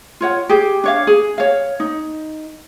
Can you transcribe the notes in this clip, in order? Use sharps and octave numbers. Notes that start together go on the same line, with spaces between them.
F4 C#5 F#5
G4 G#4
D4 C#5 F5
G#4
C#5 F5
D#4